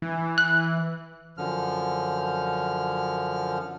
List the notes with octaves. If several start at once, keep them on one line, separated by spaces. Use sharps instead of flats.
E3
F#6
F#2 D3 F3 F6